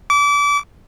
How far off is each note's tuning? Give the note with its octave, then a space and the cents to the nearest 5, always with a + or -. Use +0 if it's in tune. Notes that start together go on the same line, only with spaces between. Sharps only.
D6 -30